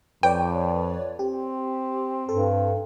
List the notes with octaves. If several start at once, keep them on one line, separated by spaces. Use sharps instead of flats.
F2 B4 C#5 D5 G5
C4 G4
G2 A4